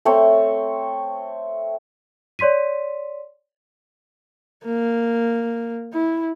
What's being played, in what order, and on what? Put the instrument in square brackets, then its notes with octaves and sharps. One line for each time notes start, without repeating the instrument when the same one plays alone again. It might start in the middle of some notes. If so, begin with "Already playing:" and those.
[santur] A3 C4 C#5
[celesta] C#5 D5 C6 B6 D#7
[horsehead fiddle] A#3
E4